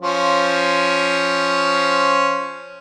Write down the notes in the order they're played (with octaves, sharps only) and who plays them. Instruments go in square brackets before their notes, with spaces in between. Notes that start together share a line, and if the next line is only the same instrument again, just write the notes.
[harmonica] F3 C#4 C5